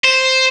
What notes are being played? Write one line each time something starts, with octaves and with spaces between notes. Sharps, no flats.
C5